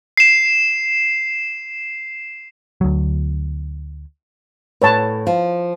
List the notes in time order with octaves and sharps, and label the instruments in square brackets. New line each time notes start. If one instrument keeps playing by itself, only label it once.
[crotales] C7 E7
[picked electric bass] D2 F#3
[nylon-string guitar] A2 [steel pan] B4 C#5 A5
[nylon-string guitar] F3